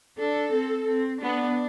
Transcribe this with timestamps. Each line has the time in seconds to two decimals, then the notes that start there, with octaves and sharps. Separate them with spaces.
0.18 D4 A4
0.52 C4
0.87 C4
1.22 B3 D4